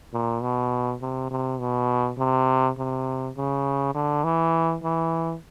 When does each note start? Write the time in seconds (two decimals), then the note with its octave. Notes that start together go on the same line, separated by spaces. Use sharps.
0.13 A#2
0.42 B2
1.02 C3
1.30 C3
1.60 B2
2.18 C3
2.78 C3
3.37 C#3
3.94 D3
4.24 E3
4.83 E3